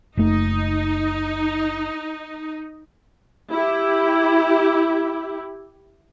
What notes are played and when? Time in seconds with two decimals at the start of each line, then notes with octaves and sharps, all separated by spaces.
0.17 F#1 A3 D#4
3.52 E4 G4